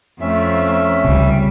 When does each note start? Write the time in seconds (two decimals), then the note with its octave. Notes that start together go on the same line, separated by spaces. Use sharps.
0.21 F2 A3 C#4 E5
1.04 C#2 C3 G3